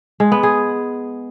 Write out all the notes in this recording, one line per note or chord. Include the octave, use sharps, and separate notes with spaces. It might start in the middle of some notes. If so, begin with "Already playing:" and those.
G#3
B3
G#4